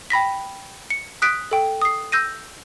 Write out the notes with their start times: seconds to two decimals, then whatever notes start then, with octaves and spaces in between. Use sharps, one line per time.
0.10 G5 B5 A#6 B6
0.90 C#7
1.22 D#6 F#6 B6 D7
1.51 A4 G5
1.82 D#6 C7
2.12 E6 G6 A#6 D#7